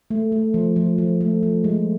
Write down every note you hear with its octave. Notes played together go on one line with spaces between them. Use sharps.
A3
A3
F3
F3
F3
A3
F3
G#3